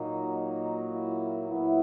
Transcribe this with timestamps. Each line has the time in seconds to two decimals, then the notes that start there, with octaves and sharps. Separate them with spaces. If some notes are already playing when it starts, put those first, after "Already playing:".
Already playing: A#2 F#3 A#3 D#4
0.33 D#4
0.92 E4
1.50 A#2 F#3 B3 E4